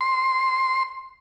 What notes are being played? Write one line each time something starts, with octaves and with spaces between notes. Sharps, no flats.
C6